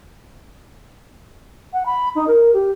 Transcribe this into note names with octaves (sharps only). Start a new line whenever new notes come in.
F#5
B5
D#4
A#4
G4